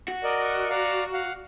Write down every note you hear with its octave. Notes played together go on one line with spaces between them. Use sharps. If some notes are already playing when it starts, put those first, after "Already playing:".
F#4
A#4 D5 D#5
D5 F5 A#5
F5 F#5